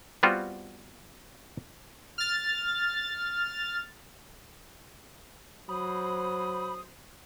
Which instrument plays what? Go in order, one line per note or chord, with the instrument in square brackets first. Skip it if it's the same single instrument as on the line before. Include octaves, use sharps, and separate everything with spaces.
[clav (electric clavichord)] G3 B3 C4 F4 F#4
[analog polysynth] F6 A6
[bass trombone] F#3 [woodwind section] C5 [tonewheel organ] B5 [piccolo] D#6